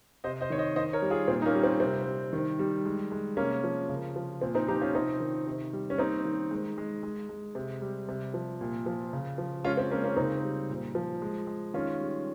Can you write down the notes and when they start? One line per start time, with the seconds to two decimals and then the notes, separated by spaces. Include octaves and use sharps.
0.24 C3 C5 D#5
0.41 C5 D#5
0.50 D#3 C#5
0.58 C5 D#5
0.76 D#3 C5 D#5
0.93 A#4 C#5
1.02 G3
1.10 F4 G#4
1.28 A#2 C4
1.42 D#4
1.46 A#3 C#4
1.55 G3
1.63 C4
1.80 C3 C4
2.06 G3
2.33 D#3
2.59 G3
2.85 G#3
3.12 G#3
3.37 C3 A#3 C#4
3.64 F3
3.89 C#3
4.16 F3
4.41 A#2 C4
4.55 C4 D#4
4.68 F3 D#4 G4
4.81 C#4 F4
4.95 C3 C4 D#4
5.20 D#3
5.46 C3
5.73 G3
5.90 C#4
5.98 A#3 C4 D#4
6.25 D#3
6.51 G#3
6.78 G#3
7.03 G#3
7.29 G#3
7.55 C3
7.82 G3
8.09 C3
8.34 F3
8.61 A#2
8.86 F3
9.13 C#3
9.38 F3
9.64 G#3 C#4 F4
9.77 C4
9.91 G#3 A#3 C#4
10.04 A#3 C#4
10.17 C#3 C4 D#4
10.43 G3
10.70 A#2
10.95 F3
11.22 G#3
11.47 G#3
11.74 D#3 C#4 F4
12.01 G3